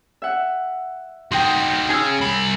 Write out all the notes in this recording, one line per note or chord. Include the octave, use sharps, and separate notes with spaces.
E5 F#5
D#4 F#4 G5 C6
G#4 C#5 G#5 E6
C2 B5